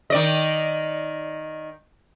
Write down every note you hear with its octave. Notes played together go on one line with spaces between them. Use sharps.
D#3 D5 D#5